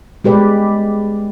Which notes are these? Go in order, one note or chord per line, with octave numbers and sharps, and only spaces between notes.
G#3 G4 B4 D5